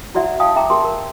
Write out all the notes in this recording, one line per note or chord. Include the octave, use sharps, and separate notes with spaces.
E4 F#4 D5 E5 F#5
F5 G5 A5 D#6
G#4 E5 G5 A#5 D6
G4 G#4 A#4 G5 A5 C6
A#4